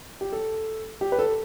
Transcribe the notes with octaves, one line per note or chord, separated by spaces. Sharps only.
G4
A4
G4
B4
A4